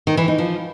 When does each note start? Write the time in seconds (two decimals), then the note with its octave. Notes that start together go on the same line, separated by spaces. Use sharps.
0.07 D#3
0.17 E3
0.28 D#4
0.38 F3